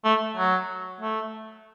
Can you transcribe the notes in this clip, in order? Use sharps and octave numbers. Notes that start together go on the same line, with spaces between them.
A3
F#3
A3